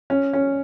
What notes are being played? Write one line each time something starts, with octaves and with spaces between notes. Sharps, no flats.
C#4
C#4